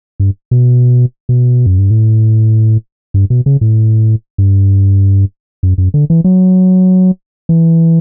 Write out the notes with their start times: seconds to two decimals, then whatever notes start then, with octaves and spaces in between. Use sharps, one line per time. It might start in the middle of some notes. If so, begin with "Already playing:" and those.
0.20 G2
0.51 B2
1.29 B2
1.66 F#2
1.78 G2
1.91 A2
3.14 G2
3.30 B2
3.46 C#3
3.61 A2
4.38 G2
5.63 F#2
5.78 F#2
5.94 D3
6.10 E3
6.24 F#3
7.49 E3